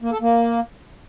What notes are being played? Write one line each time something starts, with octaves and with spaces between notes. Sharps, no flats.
A#3
A4
A#3